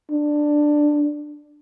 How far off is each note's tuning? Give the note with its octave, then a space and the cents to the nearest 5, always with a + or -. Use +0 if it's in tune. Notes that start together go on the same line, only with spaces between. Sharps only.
D4 +10